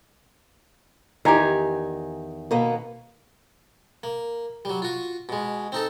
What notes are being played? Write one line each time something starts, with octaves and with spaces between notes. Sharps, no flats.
E2 D#3 G4 G#5 A#5
B2 A#3 B3
A#3
F#3 G3
F4 F#4
B2 G#3
C4 D#4 A4